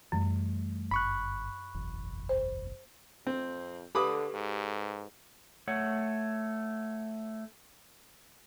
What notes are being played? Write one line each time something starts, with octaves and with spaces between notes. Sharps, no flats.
F#2 E3 G3 A3
G1 B5 C#6 F#6
F#1 B1 E2
C5
F2 C4
D3 G4 A4 B4 B5 D6 D#6
G#2
A3 C#5 F#5